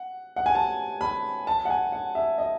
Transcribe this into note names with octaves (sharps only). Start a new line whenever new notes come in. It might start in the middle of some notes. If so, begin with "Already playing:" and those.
Already playing: F#5
F#5
G#5
A5
B5
A5
F#5
G#5
F#5
E5
D#5